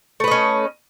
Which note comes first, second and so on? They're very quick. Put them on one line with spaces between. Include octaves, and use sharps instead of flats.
A3 B4 D#5 C#4